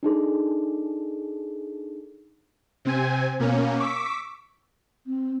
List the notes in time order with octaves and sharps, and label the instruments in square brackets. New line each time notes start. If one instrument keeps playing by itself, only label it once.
[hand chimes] D4 D#4 G#4 A4
[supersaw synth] C3 C4 G#5
B2 A#3 C#4
C#6 D6 E6 B6
[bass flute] C4